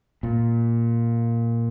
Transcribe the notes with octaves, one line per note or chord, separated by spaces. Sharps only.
A#2